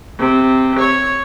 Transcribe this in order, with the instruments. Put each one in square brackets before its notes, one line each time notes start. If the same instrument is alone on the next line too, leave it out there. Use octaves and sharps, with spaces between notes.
[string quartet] C3
C#5